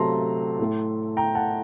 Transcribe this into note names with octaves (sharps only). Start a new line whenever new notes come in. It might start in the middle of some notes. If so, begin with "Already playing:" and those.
Already playing: C3 F#3 A3 A5 A#5 C6
A2 A3
G5 A#5
F#5 A5